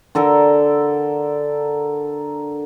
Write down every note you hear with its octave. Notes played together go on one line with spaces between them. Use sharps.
D3 A4 A#4 A#5